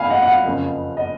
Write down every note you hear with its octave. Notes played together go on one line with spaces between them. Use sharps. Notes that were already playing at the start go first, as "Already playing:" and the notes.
Already playing: C#2 F5 G#5 B5
D#5 F#5
F#5
F5
F#1 F2 C#3
D#5